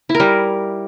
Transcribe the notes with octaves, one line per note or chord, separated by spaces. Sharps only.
E4
A#4
G3